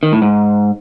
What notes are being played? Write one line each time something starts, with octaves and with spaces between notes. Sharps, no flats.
D#3
A2
G#2